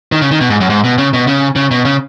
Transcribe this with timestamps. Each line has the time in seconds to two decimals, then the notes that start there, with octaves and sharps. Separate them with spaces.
0.12 D#3
0.22 C#3
0.31 D#3
0.41 B2
0.50 G#2
0.60 F#2
0.70 G#2
0.84 B2
0.98 C#3
1.14 B2
1.27 C#3
1.56 C#3
1.71 B2
1.85 C#3